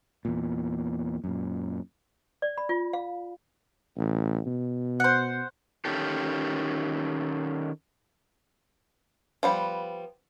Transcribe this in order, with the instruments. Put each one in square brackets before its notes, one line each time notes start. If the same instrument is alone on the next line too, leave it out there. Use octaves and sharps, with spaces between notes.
[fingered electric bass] E2 A#2
F#2 A#2
[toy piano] D5
B5
F4
F5
[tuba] A1
B2
[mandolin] C5 F#5
[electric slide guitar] D#3 C#4 G4 A4
[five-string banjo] F3 G3 B3